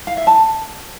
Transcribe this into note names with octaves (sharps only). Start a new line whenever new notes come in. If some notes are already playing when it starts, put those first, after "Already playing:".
F5
E5
A5